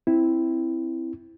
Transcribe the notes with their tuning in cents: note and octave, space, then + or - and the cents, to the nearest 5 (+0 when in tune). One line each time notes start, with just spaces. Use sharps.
C4 +0 E4 +0